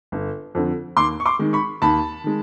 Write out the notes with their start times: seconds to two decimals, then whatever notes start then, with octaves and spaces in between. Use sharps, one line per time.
0.12 G1
0.55 F2 D3
0.97 D#2 C6 D6
1.20 C#6
1.26 C6 D6
1.39 D#3 G#3
1.53 B5 C#6
1.82 D#2 A5 B5
2.24 D#3 G#3